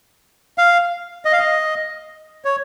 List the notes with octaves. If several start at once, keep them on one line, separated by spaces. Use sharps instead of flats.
F5
D#5
F5
D#5
C#5